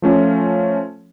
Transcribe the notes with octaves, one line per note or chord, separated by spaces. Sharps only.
F3 A3 C#4 F4